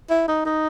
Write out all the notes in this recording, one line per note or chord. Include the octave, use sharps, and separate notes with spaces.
E4
D#4
D#4